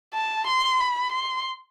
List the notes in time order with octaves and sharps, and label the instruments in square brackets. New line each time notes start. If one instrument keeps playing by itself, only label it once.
[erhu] A5
C6
B5
C6